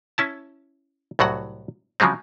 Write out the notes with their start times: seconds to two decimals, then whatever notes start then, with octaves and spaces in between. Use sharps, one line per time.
0.18 C#4 E4 A5
1.19 C2 A2 F#3 F#4 F#5
2.00 C#3 F3 F#3 G#3 C4